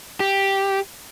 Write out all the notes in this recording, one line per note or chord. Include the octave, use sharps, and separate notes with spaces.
G4